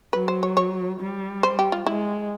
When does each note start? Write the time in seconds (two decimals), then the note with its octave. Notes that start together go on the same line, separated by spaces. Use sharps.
0.13 F#3 B4
0.28 C5
0.43 C#5
0.57 C#5
1.00 G3
1.43 C5
1.59 G4
1.72 F4
1.86 G#3 E4